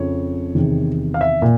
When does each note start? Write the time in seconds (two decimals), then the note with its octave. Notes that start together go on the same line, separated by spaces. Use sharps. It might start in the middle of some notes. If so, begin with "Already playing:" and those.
Already playing: F2 C#3 F3 C#5
0.55 E2 C3 D#3
1.14 F5
1.21 E5
1.42 A#2